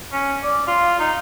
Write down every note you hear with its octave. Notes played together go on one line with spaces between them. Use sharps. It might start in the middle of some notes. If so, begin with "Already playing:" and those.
C#4
D5
F4
D#4